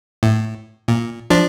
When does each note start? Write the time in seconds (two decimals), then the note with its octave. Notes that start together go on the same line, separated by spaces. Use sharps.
0.23 A2
0.88 A#2
1.30 F3 D4